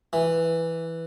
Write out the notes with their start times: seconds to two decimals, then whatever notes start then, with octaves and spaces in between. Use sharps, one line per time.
0.13 E3